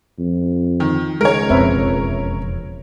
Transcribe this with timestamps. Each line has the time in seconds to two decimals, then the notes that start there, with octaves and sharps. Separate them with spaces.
0.19 F2
0.80 D#3
1.21 C#2 G#3 A#4 C#5
1.49 E1 F2 C4 B4 E5